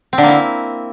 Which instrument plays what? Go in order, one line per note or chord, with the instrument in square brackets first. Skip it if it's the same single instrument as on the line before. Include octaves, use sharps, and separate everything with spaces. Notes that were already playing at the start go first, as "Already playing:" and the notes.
[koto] C4
D3
A#3
E4